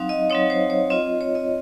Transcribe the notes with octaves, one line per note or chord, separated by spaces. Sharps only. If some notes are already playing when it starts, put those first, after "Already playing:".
Already playing: F#3 C4 D#4 F5
D#5
F#3 C4 D#4 C#5
C5
C#5
C4 F4 D#5
C#5
D#5